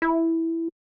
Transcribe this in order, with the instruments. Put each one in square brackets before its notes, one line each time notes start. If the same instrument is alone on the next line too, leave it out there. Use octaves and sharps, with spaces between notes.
[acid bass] E4